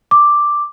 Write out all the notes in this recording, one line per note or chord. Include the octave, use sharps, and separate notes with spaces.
D6